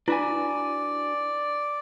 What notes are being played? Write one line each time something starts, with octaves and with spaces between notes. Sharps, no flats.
D4 E4 F#4 B4 D5 G#5